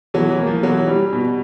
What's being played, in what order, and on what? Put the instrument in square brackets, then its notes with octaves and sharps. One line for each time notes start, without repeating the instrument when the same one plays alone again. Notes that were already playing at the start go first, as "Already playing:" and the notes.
[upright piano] B2 [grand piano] E3 F#3
[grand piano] E3
[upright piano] A#3
[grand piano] F3
[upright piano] B2 [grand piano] E3 F#3
[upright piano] G3
B2